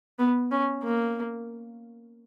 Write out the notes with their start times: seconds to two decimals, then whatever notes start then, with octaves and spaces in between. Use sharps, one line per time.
0.19 B3
0.52 C#4
0.83 A#3